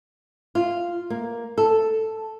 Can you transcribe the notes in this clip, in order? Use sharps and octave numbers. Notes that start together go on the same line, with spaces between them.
F4
A#3
A4